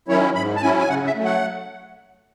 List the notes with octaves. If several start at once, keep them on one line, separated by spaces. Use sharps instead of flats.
D#3 F#3 C#4 E4 C#5
G#2 B5
A5
F#3 C#4 E4 G#5
G#5
C#3 F#5
E5
F#3 A3
F#5